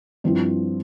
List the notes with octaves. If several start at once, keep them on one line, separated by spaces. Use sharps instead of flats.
G2 F3 C4 E4